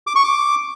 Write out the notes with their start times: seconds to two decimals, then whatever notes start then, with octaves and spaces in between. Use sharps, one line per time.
0.07 D6
0.16 C#6
0.24 D6